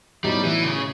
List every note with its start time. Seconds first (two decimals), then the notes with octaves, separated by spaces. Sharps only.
0.24 A2 F#3 G3 B3 D#4
0.44 E3
0.63 C#3